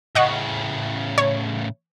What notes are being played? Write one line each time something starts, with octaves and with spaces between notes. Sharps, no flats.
A2 C#3 D#5 F#5 C#6
C#5